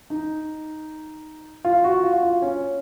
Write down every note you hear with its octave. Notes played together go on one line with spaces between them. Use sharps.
D#4
F4
F#4
F4
F4
C#4